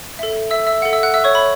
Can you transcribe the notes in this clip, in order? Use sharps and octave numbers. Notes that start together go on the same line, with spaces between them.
A4 E5
E5 E6
E5 E6
A4 F#5
E5 E6
F#5 F#6
E5 E6
C#5 C#6
B5